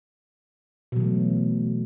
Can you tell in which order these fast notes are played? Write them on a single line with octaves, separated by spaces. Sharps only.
B2 F#3 E3 A3